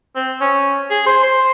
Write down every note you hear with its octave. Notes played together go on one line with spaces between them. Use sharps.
C4
C#4
G#4
C5
C5